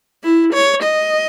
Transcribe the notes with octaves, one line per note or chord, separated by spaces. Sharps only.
E4
C#5
D#5